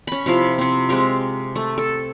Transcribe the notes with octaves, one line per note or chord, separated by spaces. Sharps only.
C#4 B5
C3 F3 E4 F5
C3 C4
G#3 C4 G4 F5
A3
A4